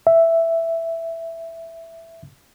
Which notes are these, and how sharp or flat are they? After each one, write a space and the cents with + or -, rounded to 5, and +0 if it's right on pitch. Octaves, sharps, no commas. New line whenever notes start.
E5 +5